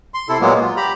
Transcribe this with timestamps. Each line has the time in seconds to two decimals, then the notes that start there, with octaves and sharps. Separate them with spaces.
0.14 C6
0.29 C3 E4 A4
0.41 A#2 F#3 G#3 A#3 B3
0.60 F4
0.77 G4 A#5 B5